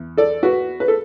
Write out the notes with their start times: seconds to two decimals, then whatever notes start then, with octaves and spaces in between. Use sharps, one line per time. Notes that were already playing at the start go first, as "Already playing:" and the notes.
Already playing: E2
0.17 A4 D5
0.43 F#4 B4
0.80 B4
0.88 A4